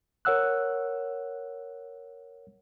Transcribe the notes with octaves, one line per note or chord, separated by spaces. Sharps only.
A#4 C#5 F#5 E6 F#6